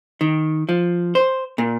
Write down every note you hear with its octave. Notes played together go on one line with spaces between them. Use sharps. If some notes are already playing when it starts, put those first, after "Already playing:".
D#3
F3
C5
A#2